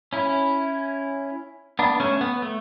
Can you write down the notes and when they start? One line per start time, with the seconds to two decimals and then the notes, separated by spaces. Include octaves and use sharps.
0.13 C#4 E4
1.79 B3 D4
2.00 A3 C#4
2.21 B3
2.42 A3